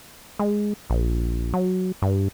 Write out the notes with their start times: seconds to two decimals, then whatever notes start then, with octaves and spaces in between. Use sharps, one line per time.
0.39 G#3
0.90 A#1
1.54 F#3
2.02 G2